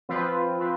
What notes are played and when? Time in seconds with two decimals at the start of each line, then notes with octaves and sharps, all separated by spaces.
0.09 F3 C4 F4 B4
0.58 F3 C4 F4 B4